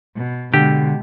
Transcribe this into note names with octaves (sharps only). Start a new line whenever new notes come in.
B2
B2 D3 G#3 G4